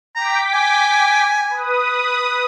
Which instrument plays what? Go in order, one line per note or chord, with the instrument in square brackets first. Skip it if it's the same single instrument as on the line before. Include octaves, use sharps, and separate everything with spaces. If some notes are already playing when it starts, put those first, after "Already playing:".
[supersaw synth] G5 D6 B6 [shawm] A#5
[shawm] G#5
[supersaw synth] B4 D#6